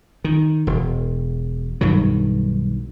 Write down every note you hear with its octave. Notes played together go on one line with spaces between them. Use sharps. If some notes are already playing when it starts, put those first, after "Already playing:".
D#3
E1
B1 G2 D#3 F#3